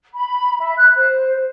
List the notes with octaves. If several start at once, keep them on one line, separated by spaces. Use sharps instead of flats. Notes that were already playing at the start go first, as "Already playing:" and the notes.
B5
E5
F#6
C5